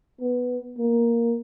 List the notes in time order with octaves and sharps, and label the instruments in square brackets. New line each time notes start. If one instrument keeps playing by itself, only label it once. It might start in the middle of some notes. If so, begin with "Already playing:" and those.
[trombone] B3
A#3